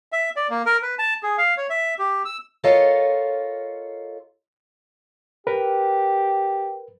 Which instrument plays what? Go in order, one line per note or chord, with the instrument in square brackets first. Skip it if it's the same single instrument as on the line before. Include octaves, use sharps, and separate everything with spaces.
[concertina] E5
D5
A#3
A#4
B4
A5
G#4
F5
C#5
E5
G4
E6
[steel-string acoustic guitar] F4 A4 A#4 C#5 D#5 F5
[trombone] G4 [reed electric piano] A#4 B4